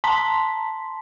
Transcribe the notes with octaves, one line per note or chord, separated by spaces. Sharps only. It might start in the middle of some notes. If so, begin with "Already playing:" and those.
A5 A#5 C6 B6